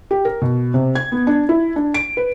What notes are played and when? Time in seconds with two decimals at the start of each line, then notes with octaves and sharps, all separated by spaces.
0.11 G4
0.25 A#4
0.42 B2
0.74 C3
0.95 G#6
1.12 B3
1.27 D4
1.49 E4
1.76 D4
1.94 D7
2.17 B4